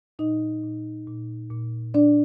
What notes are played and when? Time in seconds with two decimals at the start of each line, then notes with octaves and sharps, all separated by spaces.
0.19 A#2 D#4 D#5
0.63 A#2
1.07 A#2
1.51 A#2
1.94 A#2 D4 D5